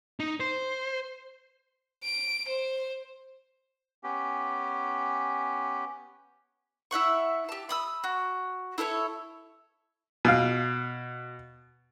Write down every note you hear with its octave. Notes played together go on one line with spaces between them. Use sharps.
D#4
C5
D7
C5
B3 C#4 G4
E4 E5 F#5 C#6
G4 A5
B5 D#6 E6
F#4
E4 A4 C5 C#5
B2 F5